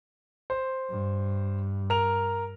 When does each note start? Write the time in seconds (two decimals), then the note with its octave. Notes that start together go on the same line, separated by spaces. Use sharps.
0.50 C5
0.90 G2
1.90 A#4 F7